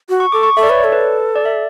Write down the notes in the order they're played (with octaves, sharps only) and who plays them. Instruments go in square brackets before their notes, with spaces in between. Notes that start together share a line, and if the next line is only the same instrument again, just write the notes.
[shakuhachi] F#4
[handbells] C#6
[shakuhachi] A4 [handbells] D6
[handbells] C#6
[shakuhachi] A4 [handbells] E5
[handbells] D5
[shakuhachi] B4 [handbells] C#5
[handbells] D5
[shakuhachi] A4
[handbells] B4
D5
E5